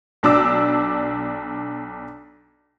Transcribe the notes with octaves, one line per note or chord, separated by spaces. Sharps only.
B1 D4 D6 E6